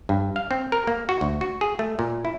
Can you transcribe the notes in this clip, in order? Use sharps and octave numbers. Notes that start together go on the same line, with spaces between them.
G2
F5
C4
A#4
A#3
F#4
D2
F#4
G#4
A3
A#2
E4